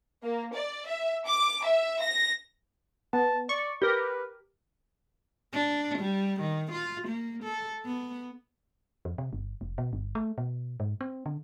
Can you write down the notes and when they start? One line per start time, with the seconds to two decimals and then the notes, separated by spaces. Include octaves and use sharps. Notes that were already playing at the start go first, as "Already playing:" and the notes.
0.23 A#3
0.55 D5
0.88 E5
1.27 D6
1.66 E5
2.01 A#6
3.13 B3 A5
3.49 D5 C#6
3.82 G4 A#4 B4
5.53 D4
5.98 G3
6.41 D#3
6.72 F4
7.08 A#3
7.44 A4
7.85 B3
9.05 F2
9.18 C3
9.33 G1
9.61 F1
9.78 B2
9.93 G1
10.15 A3
10.38 B2
10.80 G#2
11.01 C4
11.26 D3